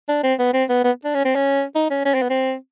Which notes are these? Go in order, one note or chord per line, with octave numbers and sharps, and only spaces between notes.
D4
C4
B3
C4
B3
B3
D4
C#4
C4
C#4
D#4
C#4
C#4
C4
B3
C4